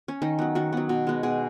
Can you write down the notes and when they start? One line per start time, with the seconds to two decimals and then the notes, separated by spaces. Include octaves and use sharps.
0.08 C#4
0.22 D#3 D#4
0.39 F#3 B3
0.55 D#3 F#4
0.73 F#3 B3
0.89 B2
1.07 G#3 B3
1.23 B2 G#4